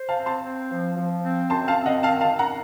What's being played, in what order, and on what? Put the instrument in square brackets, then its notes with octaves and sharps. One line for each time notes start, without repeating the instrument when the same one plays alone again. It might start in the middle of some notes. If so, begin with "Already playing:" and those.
Already playing: [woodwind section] C5
[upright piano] F5 A5
[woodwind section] C4
[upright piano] A5 C6
[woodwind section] C4
F3
F3
C4
[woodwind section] F#2 [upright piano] A5 C6
[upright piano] F5 A5
[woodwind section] C4
[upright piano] D#5 F#5
[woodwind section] D#3 [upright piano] F5 A5
[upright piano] F5 A5
[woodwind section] D#3
[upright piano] F#5 A#5